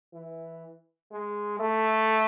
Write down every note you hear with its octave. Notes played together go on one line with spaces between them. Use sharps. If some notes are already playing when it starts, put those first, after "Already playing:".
E3
G#3
A3